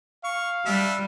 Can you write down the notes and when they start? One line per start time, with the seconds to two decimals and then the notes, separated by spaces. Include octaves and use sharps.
0.24 F5 C#6
0.66 G3 D4 E5